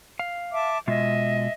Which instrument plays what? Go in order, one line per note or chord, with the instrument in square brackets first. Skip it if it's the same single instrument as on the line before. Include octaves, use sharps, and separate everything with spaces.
[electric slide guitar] F5
[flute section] E5 A5 D6
[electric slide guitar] B2 G#3 F4 [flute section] D#5 E5